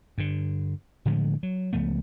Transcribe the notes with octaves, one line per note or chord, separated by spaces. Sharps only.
G2 D3
A2 D3 F3 G#3
F#3
C#2 F3 A3 B3